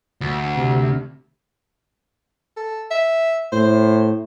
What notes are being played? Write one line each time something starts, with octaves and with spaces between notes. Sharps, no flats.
D2
C3
A4
E5
A2 C5